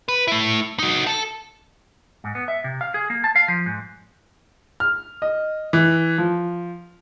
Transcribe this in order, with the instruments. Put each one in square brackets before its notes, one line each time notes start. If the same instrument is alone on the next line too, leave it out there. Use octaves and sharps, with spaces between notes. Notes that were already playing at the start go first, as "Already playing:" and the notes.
[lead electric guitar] B4
A3 E4
D#4 F#4
A4 A5
[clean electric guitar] G#2
B3
E5
C3
F5
G#4
A#3
A5
F5
F3
G#2
[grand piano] F6
D#5
E3
F3